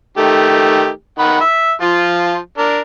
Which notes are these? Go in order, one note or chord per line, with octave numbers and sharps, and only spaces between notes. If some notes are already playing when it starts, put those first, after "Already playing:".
D#3 A3 G4
D#3 F#5 B5
E5
F3 F4
D4 A#4